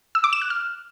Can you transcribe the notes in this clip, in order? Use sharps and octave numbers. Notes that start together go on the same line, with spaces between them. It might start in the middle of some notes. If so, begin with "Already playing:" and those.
E6
D6
E7
F#6
F6